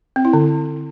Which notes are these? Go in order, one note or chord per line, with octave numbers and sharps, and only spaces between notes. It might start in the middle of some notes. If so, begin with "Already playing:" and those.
C4
E4
D3